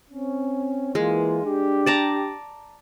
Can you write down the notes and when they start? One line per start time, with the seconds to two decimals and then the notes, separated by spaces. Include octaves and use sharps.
0.10 C4 C#4
0.95 E3 G#3 A#3 F4
1.44 D4 G4
1.86 D5 A5 A#5